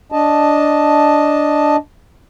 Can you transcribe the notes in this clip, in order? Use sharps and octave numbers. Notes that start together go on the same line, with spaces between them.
D4 D#5 A5